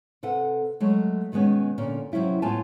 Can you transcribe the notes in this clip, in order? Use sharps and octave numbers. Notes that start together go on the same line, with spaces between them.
C3 A4 B4 F#5
F#3 G#3 A3
B2 D#3 G#3 B3 C#4
A#2 D3 C#4
C3 F#3 C#4 E4 F4
A2 G3 B3 F4 G#5 A5